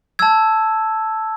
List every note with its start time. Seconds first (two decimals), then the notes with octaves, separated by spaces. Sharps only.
0.19 A5 E6 G#6